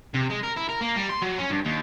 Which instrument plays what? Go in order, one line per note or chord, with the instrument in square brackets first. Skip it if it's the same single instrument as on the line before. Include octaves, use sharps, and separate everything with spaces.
[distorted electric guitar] C3
G#3
A#4
E4
A#4
A#3
G3
C6
F#3
C#4
G2
D#2